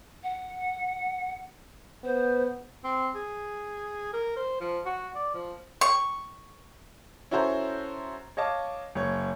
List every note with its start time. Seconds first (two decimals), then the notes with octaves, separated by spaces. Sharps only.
0.23 F#5
2.04 B3 C5
2.84 C4
3.15 G#4
4.13 A#4
4.36 C5
4.60 F3
4.85 F#4
5.15 D5
5.34 F3
5.81 C#6
7.31 C#4 E4 F#4 A4 C5 A#5
8.37 C#5 D#5 F5 A5 D6
8.95 F#1 C#5